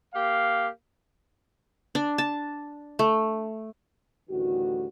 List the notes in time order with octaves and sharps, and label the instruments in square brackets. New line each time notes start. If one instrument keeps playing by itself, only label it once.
[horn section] A#3 G4 F5
[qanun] D4
A5
A3
[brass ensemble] A1 D2 D#3 G3 F#4